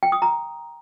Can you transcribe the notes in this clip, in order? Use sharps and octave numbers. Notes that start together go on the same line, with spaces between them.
G5
D#6
A#5